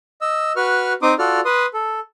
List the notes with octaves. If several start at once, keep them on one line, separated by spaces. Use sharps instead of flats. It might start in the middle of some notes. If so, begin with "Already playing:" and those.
D#5 E6
F#4 B4 C#6 F6
C4 D#4 C6 D6 D#6
F4 F#4 A4 D5 F6
B4 C6 D#6
A4